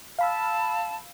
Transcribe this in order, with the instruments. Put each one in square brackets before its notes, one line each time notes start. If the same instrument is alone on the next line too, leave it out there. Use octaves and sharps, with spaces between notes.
[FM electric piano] F5 B5 E6 [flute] A5